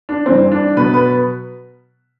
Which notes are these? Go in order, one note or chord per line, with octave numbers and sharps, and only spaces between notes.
D4
G2 E3 G3 C4
D4
B2 F#3 B3 B4
B4